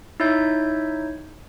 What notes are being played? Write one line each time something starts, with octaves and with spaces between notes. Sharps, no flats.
D#4 E4 C#5 E5 G6